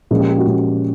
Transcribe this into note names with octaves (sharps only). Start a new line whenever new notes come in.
A#2 F3 G#3 C#4 G#4
G4
G4
F#4
A#2 F3 G#3 C#4